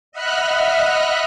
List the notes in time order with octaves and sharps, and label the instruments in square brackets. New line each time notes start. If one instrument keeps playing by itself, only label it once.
[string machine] D#5 E5 F#5 B5 F6 F#6